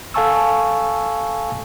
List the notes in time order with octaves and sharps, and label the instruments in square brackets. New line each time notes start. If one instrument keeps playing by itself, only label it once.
[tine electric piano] A4 F5 G#5 A5 C#6 E6